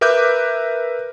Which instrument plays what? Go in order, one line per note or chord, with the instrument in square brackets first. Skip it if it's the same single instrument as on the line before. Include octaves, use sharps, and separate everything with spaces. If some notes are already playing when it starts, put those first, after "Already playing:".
[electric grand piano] A#4 B4 E5 D6 F#6 G6